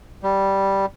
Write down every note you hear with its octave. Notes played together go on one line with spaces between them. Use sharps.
G3